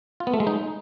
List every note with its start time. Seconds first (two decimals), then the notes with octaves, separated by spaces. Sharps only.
0.20 F4
0.27 B3
0.34 A3
0.40 G#3
0.47 D#4